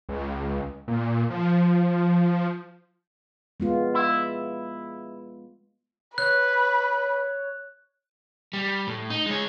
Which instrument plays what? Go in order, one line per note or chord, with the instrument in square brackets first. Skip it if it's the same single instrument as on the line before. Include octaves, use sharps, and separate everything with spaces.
[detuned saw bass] C#2
A#2
F3
[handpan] G#3 B3 F4
[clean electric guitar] E4
[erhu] B4 [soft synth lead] C#5 [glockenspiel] F#6
[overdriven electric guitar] G3
A2
D#4
G#3 C#5